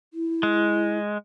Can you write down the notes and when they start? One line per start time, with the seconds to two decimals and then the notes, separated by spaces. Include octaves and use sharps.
0.13 E4
0.43 G#3